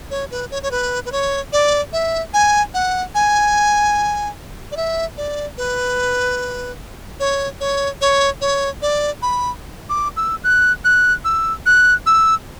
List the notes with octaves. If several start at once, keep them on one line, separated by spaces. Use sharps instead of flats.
C#5
B4
C#5
C#5
B4
B4
C#5
D5
E5
G#5
F#5
G#5
D5
E5
D5
B4
C#5
C#5
C#5
C#5
D5
B5
D6
E6
F#6
F#6
E6
F#6
E6